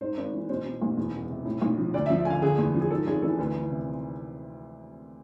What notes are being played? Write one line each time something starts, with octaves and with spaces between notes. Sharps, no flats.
G#2 C5
G#1
E3
B2 C5
B2
B1
E2
E1
C3
A2
B1
F3
D2 D5
E5
F3
E5
D3 F5 G#5
D3 G#4
E2
F3
G#4
G#2 A4
G#1 G#4
E3 A4
D2 B4
E3
C3